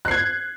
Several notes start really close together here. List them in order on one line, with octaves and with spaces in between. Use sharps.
F#6 C7 G#6